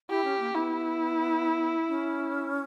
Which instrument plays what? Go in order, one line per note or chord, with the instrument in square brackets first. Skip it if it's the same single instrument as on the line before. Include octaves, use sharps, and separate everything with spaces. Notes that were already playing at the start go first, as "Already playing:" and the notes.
[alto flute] E4 [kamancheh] G4
[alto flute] C#4
A#3
[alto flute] B3 [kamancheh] E4
[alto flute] C#4